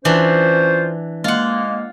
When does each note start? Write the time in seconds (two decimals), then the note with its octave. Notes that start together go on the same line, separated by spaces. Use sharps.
0.05 E3 C#4 D4 F4 C5
1.24 G#3 A#3 F4 F#5